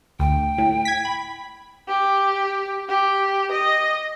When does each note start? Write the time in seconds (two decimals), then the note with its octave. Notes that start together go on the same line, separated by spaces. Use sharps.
0.19 D2 G5
0.58 A2
0.85 G#6 B6
1.05 B5
1.88 G4
2.89 G4
3.51 D#5